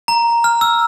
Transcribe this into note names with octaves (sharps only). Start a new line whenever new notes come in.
A#5
F6
E6